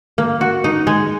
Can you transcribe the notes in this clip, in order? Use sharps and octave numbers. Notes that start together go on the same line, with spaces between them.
A#3
F#4
D#4
G#3